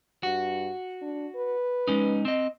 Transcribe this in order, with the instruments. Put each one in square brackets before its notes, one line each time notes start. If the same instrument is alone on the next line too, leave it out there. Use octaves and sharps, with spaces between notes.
[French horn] G2 [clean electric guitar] F#4
[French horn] D4
B4
[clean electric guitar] G#3 C#4 D#4
C4 D#5